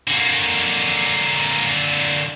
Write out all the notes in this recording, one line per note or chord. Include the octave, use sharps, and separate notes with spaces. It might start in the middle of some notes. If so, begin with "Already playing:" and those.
D3 A#3